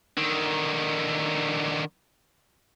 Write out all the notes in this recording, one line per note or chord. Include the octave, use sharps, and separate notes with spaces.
D3 D#3